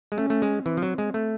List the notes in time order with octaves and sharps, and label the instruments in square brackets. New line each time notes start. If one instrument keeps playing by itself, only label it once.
[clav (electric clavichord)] G#3
[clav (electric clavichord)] A3 [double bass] C#4
[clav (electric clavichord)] A3
G#3
[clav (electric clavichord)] E3 [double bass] C4
[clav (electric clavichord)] F3
F#3
G#3
A3